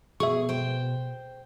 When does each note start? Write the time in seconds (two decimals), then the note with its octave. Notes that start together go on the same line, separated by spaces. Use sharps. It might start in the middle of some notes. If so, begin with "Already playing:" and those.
0.20 B2 G#4 E5 C#6
0.49 C5 G5